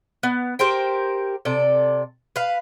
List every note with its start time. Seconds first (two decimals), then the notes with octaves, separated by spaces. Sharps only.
0.23 B3
0.59 G4 A#4 C5 G5
1.45 C3 A4 D5
2.36 B4 F5